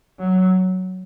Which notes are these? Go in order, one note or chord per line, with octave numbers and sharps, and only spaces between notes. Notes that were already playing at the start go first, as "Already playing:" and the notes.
F#3